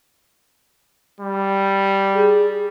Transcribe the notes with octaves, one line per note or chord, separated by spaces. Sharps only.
G3
G#4